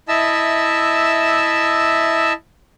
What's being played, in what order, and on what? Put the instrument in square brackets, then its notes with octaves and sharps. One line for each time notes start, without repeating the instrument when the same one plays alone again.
[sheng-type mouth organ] E4 D#5 E5 A5 E6